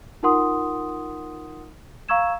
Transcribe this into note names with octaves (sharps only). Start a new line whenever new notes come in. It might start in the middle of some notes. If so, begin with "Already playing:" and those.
D#4 F4 A#4 F#5 C6 D#6
F5 A#5 C#6 E6 G#6 E7